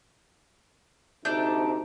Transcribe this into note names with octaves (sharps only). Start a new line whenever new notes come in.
D2 C3 A3 D4 D#4 G6